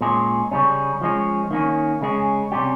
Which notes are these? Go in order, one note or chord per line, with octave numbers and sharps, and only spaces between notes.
A#2 G#3 C#4 G#4
C#3 G3 C#4
F3 G#3 C#4
D#3 A#3 C#4
C#3 G#3 C#4 G#4
C3 G3 C#4 G4